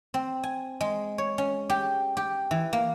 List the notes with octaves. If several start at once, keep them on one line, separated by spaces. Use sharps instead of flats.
C4
G#5
G#3
C#5
C#4
G4
G4
E3
A#3